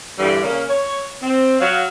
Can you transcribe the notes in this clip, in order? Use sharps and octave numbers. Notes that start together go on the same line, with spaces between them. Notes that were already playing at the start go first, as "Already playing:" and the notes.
G2 D3 E3 G3
C#3 A#3 C#4
C#5
C4
F#3 F5